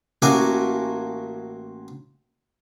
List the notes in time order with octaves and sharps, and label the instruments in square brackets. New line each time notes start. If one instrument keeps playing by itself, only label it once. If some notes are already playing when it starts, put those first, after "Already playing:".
[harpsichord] A1 A#3 F#4 A#4 G#5 D6